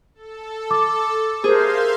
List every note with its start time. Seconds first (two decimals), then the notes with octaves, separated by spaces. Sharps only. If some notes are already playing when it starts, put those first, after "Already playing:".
0.15 A4
0.71 D6
1.44 G#4 A#4 C5 E5 F5 C6